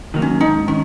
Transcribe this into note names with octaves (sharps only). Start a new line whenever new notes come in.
D#3 F#3 A#3
C#4
G#2 D#4
D#3 C#4